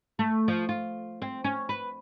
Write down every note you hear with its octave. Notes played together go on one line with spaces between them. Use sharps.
A3
F3
F4
C4
C#4
B4